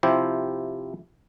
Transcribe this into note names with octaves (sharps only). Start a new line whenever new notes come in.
C3 F3 E4 G4 C5